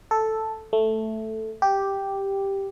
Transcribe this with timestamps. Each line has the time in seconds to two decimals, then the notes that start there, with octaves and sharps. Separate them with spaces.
0.11 A4
0.73 A3
1.62 G4